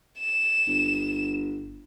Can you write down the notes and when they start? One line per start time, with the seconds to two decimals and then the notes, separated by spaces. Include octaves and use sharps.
0.19 E7
0.67 G1